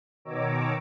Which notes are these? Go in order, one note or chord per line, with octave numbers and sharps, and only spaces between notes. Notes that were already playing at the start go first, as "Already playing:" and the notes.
B2 D#3 C#5 A#5 D6 E6